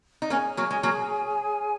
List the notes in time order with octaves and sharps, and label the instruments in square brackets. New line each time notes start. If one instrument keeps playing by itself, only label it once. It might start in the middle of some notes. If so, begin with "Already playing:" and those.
[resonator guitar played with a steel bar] D#4
[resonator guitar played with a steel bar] A#3 C#4 [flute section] G#4 C#5 G#5
[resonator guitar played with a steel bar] F#3 A#3
G#3
F#3 A#3